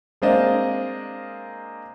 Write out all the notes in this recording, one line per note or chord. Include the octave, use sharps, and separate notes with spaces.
G#3 A#3 C4 D4 D#5 F5